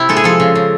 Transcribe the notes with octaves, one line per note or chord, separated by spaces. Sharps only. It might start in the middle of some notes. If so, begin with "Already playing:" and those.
Already playing: C3 E4
G#3 A4
G#4
F3 A4
C#3
C#3